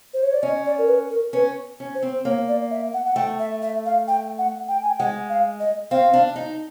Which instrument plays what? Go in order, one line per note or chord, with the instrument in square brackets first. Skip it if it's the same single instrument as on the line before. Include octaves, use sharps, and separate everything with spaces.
[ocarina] C5
C#5
D5
[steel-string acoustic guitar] C#4 [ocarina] D#5
[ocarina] D5
A#4
B4
A#4
[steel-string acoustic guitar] C#4 [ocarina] B4
[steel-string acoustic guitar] C#4
[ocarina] C5
[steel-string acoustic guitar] C4
[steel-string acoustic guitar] A#3 [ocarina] C#5
[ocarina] D5
E5
F#5
F#5
[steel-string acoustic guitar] A3 [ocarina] G5
[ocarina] E5
E5
F5
G5
F#5
G5
G#5
G5
[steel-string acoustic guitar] G#3 [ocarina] F#5
[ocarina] F5
D#5
[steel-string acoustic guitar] C4 [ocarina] F5
[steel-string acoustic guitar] D4
D#4